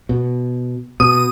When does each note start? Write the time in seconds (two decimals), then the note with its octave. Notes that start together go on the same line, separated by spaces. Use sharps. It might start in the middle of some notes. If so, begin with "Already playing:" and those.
0.09 B2
1.00 B2 D#6